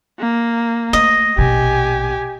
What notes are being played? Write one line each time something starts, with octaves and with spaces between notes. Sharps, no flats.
A#3
A3 D#5
A#1 B2 G4 G#5